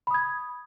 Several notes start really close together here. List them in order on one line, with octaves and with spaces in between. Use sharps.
B5 D#6 G#6